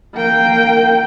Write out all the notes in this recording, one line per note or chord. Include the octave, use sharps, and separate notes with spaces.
A#3 G5